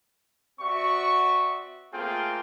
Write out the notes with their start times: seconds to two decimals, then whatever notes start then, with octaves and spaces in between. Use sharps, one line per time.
0.60 C4 F#4 D5 E5 C#6
1.93 A3 A#3 C4 F4 G#4 G5